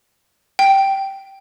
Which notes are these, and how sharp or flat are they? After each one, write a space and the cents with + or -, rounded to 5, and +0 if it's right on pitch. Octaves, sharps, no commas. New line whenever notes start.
G5 -10